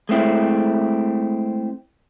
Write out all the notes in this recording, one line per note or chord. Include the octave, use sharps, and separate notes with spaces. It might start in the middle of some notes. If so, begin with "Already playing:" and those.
G#3 A3 C4 E4